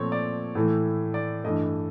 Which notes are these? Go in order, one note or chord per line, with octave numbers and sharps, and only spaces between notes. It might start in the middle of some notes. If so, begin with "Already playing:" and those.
Already playing: A#2 F3 A3 C4 C#5
D5
A2 E3 A3
D5
G2 E3 A3 D#5